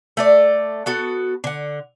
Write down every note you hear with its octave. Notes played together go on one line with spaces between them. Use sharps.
A3 A4 D5
B3 F#4 A4
D3 F#5